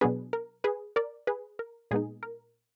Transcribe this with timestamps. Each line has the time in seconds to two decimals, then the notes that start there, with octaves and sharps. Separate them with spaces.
0.01 B2 F#3 B3 D4 G#4 B4
0.33 A#4
0.64 G#4 B4
0.96 A#4 D5
1.27 G#4 B4
1.59 A#4
1.91 A#2 G#3 B3 D#4 G#4
2.23 A#4